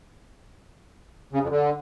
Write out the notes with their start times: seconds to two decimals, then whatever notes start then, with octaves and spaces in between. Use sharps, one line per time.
1.33 C#3
1.41 F2
1.50 D3